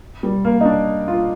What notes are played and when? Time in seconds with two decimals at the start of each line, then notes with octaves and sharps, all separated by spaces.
0.23 G3
0.45 A#3
0.61 D#4
0.65 D4
1.08 F4